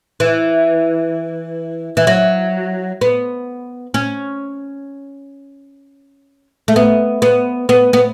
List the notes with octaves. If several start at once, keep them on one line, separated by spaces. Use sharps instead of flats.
E3
E3
F#3
B3
C#4
A3
B3
B3
B3
B3